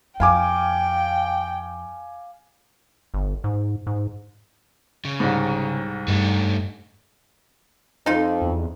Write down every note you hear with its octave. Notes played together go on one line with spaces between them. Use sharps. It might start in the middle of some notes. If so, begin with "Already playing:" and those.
F2 F5 G5 G#5 D6
G1
G#2
G#2
C#3
C2 G#2
G2 A3 D#4
F2 D#4 F4
E2